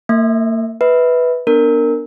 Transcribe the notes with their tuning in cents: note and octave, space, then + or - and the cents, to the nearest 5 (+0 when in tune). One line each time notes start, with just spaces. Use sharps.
A#3 -35 E5 +0
B4 +0 E5 -30
B3 +0 D4 +15 A#4 -15